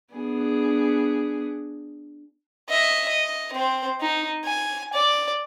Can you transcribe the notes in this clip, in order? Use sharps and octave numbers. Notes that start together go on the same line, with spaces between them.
B3 D4 G#4
D#5 E5
D#5
C4 C5
D#4
G#5
D5